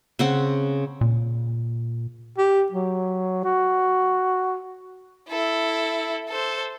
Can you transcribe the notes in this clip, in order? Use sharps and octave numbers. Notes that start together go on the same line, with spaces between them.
C#3 C4 F#5
A#2
G4
F#3
F#4
E4 A4
A4 C5